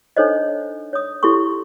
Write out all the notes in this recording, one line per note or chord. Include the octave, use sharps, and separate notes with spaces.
D4 D#4 A4 C5 C#5 D#5
C#5 D#6
E4 G4 A4 C6 C#6